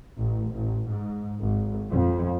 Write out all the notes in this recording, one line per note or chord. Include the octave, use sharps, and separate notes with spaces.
A1
A1
G#2
G#1
F2